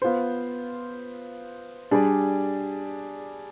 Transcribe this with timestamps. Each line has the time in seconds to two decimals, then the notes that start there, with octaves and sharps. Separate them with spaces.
0.02 B3 F4 C5
1.91 G3 D4 G#4 D5